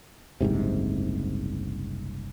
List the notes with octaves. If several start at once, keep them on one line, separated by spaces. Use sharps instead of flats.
F#1 C2 G#2 C3